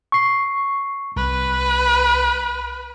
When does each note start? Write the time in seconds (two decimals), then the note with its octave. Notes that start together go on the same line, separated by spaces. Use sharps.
0.12 C#6 C7
1.16 C2 B4